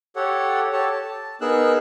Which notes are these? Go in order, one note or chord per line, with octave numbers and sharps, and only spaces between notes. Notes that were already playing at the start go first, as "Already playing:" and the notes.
G4 A4 C#5 F#5
G4 A4 C#5 A5
A5
B3 D#4 G#4 A#4 E6 F#6